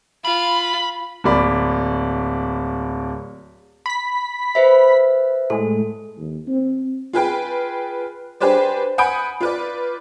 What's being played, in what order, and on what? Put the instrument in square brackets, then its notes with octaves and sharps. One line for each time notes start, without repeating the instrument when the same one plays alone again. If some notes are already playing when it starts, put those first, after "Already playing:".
[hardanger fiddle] F4 [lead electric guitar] B5
[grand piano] D1 A#3 D5 B5
[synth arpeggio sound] B5 B6
[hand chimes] B4 C5 E5
[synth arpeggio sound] A2 G#3 [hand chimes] A4
[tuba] D#2
C4
[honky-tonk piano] F4 G#4 B4 G5
D4 G4 G#4 B4 C5 D5
F#5 G#5 B5 D#6 G6 D7
F4 B4 D5